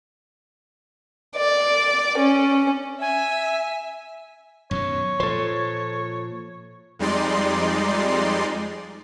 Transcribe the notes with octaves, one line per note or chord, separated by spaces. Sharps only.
D5
C#4
E5 G#5
F#2 B2 D#3 C#5
A#2 F3 A4 C5
F2 G3 G#3 D#4 D5 C6